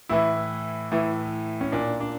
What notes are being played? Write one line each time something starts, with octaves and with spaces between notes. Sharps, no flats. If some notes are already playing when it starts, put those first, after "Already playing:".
A2 E3 E4
A2 E3
C#4
A#2 D4
D4